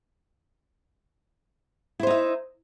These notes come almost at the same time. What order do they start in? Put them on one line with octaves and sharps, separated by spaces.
E4 C5 D#4 E5